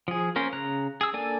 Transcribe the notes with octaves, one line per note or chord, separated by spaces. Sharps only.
F3 G#4
A#3 C#4 A#4 C5
C#3 A#5 F#6
G#4 E6
A#3 D4 A4 D5 G#5